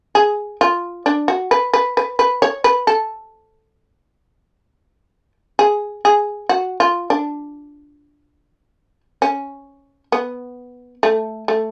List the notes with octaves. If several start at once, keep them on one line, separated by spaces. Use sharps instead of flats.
G#4
F4
D4
F#4
B4
B4
B4
B4
C#5
B4
A4
G#4
G#4
F#4
F4
D4
C#4
B3
A3
A3